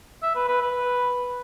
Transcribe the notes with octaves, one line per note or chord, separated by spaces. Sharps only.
E5
B4
B4
B4